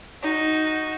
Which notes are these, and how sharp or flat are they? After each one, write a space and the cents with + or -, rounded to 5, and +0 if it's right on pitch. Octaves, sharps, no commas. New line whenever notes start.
D#4 +0 F#4 +0